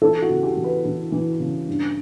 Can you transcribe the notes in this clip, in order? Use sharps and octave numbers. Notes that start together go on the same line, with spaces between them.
E3 A4
F#4
C#3
G4
E3
B4
E3
E3
C#3
G2